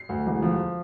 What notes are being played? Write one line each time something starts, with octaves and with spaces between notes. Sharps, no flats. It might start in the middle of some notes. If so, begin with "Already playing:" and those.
Already playing: C7
D2
E1
F3